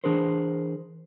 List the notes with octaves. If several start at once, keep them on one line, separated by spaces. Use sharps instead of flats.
E3 D4 G#4 A#4 C5